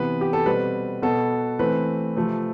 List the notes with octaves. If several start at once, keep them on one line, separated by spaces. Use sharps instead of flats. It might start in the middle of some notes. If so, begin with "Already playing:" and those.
Already playing: C3 E3 B3 B4
G4
A4
B2 G3 C4 B4
B2 B3 A4
E3 A3 C4 B4
C3 F3 A3 C4